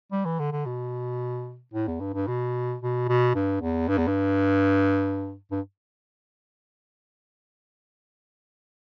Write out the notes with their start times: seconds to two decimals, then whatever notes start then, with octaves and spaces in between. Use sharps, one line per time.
0.12 G3
0.25 E3
0.39 D3
0.52 D3
0.66 B2
1.73 A2
1.87 E2
2.00 G2
2.14 G2
2.27 B2
2.82 B2
3.08 B2
3.35 G2
3.62 E2
3.88 G2
3.98 E2
4.08 G2
5.51 G2